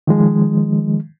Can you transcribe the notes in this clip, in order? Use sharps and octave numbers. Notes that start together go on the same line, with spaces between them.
D#3 F3 G#3